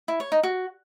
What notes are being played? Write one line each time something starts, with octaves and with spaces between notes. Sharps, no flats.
E4
C#5
D#4
F#4